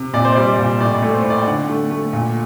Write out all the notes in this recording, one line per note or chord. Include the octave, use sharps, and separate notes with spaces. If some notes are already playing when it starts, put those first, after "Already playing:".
Already playing: C3
A#2 D5
C5
G3 D5
A#2
A2 D5
A3
C5
A2
D5
G5
D3 F#5
A3
A3
A#2